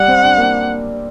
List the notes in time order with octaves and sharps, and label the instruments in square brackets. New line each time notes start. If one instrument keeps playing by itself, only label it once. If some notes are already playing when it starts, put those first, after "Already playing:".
Already playing: [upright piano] G3 [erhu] F#5
[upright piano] C4
D4
A#3